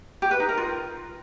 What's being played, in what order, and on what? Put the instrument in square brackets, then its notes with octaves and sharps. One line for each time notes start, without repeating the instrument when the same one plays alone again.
[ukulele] G4
B4
D#4
A#4
F4